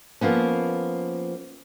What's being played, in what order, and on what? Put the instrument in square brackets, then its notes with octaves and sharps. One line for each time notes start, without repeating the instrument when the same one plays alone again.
[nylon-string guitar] F3 A#3 B3 C#4